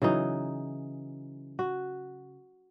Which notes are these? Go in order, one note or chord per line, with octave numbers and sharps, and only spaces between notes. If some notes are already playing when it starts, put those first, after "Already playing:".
C#3 E3 F#3 D#4
F#4